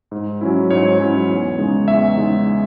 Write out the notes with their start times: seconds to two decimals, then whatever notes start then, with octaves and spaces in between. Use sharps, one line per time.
0.11 G#2
0.41 F#3 C#4 E4
0.70 G#2 C#5
0.99 F#3 C#4 E4
1.29 E2
1.58 C#3 G#3 D#4
1.88 E2 E5
2.17 C#3 G#3 D#4